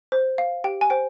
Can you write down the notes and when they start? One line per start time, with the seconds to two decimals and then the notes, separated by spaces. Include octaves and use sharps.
0.12 C5
0.38 F5
0.64 G4 G5
0.81 G#5
0.90 C5 G5